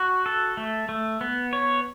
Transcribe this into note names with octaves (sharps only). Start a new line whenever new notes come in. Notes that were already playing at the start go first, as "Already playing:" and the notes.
Already playing: F#4
A4
A3
A3
B3
C#5